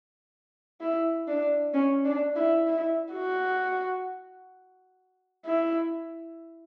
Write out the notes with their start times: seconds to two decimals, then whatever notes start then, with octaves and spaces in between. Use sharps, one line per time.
0.81 E4
1.27 D4
1.74 C#4
2.05 D4
2.36 E4
2.67 E4
3.13 F#4
5.46 E4